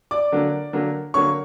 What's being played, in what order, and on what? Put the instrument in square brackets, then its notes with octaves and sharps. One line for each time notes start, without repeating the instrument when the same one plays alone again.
[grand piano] D5 D6
D3 F#3 A#3
D3 F#3 A#3
D3 F#3 A#3 C#5 C#6